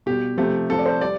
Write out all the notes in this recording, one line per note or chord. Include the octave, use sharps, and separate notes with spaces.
B2 G3 G4
C3 F3 A3 G4
C3 F3 A3 A4
D5
C5
G3 D5